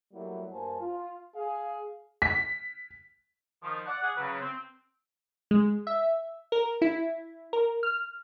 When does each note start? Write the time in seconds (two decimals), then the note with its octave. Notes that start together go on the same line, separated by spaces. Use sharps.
0.13 F#3 G3 A3 A#3 E4 F#4
0.52 G2 A#3 A#4 C5 G#5 A5
0.81 F4
1.35 G#4 F5
2.22 B6
3.63 D#3 F3
3.86 D5 F#5
4.02 G#4 F#5
4.16 C#3 F#3 B4
4.40 C4
5.51 G#3
5.87 E5
6.52 A#4
6.82 E4
7.53 A#4
7.83 F6